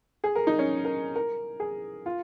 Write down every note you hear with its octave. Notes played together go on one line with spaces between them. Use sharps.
G#4
A#4
D#4
C#4
A#4
A#4
G#4
F4